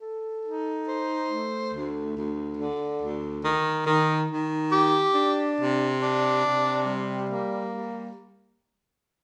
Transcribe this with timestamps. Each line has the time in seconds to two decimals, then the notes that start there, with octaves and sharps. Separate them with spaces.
0.01 A4
0.44 D#4
0.87 C5
1.29 A3
1.72 D2
2.15 D2
2.57 D3
3.01 D2
3.44 D#3
3.86 D#3
4.29 D#3
4.72 G4
5.15 D4
5.58 C3
6.01 D4
6.44 C3
6.86 G3
7.29 A#3
7.72 G3